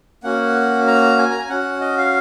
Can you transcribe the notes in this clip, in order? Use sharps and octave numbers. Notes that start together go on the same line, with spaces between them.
A#3 C#4 F#4 F#5
A#5
G#5
A#5
G#5
C#4 F#4 F#5
D#5
F5